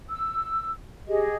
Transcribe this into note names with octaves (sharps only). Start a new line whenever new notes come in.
E6
G4 G#4 D#5